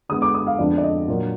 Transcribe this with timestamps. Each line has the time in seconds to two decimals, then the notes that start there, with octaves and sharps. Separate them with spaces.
0.09 D3 G#3 B3 D#6
0.22 D6
0.34 D#6
0.47 F5
0.58 F2 D3 G#3 B3 D4 D5
0.78 D5
0.84 D#5
1.08 A#2 F#3 D4